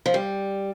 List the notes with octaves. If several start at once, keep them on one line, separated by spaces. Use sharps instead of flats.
F3
G3